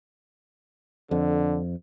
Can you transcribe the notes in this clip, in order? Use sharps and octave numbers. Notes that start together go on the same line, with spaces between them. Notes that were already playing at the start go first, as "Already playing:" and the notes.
F2 D3